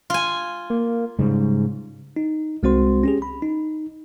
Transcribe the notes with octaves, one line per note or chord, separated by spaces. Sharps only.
F4 G#5
A#3
G#2 C#3 G3 G#3
D#4
C2 G#3 C4 F#4 C5 C6
C#4 G4 G#4
B5
D#4